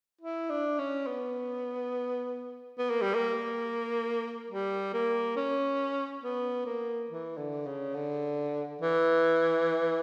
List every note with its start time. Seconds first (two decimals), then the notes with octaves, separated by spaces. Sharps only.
0.21 E4
0.50 D4
0.78 C#4
1.07 B3
2.79 B3
2.90 A#3
3.02 G3
3.14 A#3
4.50 G3
4.93 A#3
5.37 C#4
6.23 B3
6.66 A#3
7.10 E3
7.37 D3
7.66 C#3
7.95 D3
8.82 E3